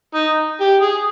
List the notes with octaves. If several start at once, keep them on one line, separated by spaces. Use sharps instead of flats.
D#4
G4
G#4